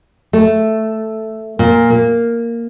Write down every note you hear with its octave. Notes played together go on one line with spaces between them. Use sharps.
A3
A#2
A#3